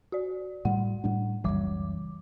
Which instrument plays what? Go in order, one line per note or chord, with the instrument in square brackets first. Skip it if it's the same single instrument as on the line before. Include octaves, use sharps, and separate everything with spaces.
[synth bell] F#4 D5
[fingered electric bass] A2 G3 [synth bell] F#5
[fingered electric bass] A2 G3 D4
[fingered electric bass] F#1 C#2 F#2 [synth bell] E3 G3 D6